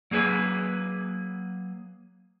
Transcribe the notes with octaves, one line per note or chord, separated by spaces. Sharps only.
F#3 A#3 G#4 B4